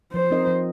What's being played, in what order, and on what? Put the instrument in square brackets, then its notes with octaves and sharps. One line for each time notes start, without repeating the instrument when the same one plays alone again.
[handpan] F3 [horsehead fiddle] C5
[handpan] C4 D#4 A#4 D#5
F3